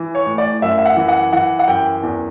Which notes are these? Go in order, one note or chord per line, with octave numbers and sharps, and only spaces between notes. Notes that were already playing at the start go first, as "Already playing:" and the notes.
Already playing: E3
C#5
A2
D5
F#2 E5
E5
F#5
E3
F#5
E3 F#5
F#5
F#2 G5
E2